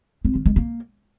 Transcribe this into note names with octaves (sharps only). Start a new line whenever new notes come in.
C4
D#3
G#3
A#3